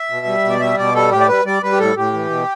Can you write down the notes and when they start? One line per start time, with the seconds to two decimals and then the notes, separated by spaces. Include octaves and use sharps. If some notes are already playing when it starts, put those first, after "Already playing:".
Already playing: E5
0.10 B2
0.26 G3
0.44 B2
0.50 D5
0.60 G3 E5
0.78 B2 D5
0.94 G3 A4
1.11 A2 G4
1.21 D5
1.28 G3 B4
1.45 G3 D5
1.63 G3 B4
1.72 G4
1.79 A2 A4
1.96 A2 G4
2.13 E3
2.30 B2